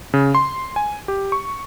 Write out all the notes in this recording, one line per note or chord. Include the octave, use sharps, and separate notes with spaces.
C#3
C6
G#5
G4
C#6